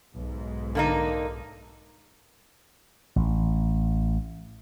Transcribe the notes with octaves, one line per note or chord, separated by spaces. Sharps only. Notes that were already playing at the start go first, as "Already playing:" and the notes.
B1 G#2
D3 A#3 D#4
A1